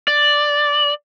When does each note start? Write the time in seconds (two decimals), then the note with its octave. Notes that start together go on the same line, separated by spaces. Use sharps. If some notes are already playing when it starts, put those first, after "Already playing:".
0.08 D5